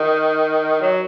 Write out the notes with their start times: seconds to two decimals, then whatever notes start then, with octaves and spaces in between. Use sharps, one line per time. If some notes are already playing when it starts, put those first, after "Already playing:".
Already playing: D#3
0.81 F#3